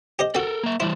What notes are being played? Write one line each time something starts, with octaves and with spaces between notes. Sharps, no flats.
G4 C5 D#5
C4 F#4 A4 A#4
A#3 E5
E3 G3 E4 C5